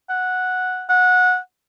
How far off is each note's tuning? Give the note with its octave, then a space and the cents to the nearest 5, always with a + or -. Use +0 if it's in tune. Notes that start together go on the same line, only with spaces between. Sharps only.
F#5 -5
F#5 -20